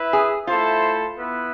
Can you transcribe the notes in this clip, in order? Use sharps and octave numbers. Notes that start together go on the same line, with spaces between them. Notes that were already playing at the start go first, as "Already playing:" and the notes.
Already playing: E4 B4 E5
G#4
A3 E4 F4 A4 C5
B3 E4 B4 E5